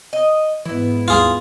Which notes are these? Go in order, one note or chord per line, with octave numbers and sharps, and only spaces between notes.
D#5
G#2 E3 B3 E4
D#2 G3 F4 G#4